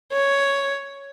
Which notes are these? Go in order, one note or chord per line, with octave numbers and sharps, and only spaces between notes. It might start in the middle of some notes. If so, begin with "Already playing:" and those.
C#5